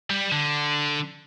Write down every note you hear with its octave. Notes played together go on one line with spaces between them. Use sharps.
G3
D3